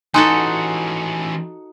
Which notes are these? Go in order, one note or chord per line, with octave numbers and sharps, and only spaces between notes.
E3 C#4 D#4 F#4 A4 G#5 C6